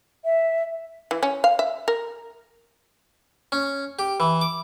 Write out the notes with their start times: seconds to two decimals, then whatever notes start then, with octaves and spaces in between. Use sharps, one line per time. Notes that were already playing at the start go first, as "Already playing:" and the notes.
0.25 E5
1.11 E3
1.23 C#4
1.44 F5
1.59 E5
1.88 A#4
3.52 C#4
3.99 G4
4.20 E3
4.41 D6